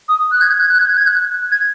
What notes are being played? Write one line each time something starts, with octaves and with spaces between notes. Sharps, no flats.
D#6
F#6
G#6
F#6
G#6
F#6
G#6
F#6
G#6
F#6
G#6